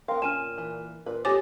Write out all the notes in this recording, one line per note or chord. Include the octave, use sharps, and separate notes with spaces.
B3 A#4 F5 G5 C6
A#2 C#4 G#5 F6 D#7 E7
E3
A#2 B4
F2 G4 C#5 G#5 D6 A6 A#6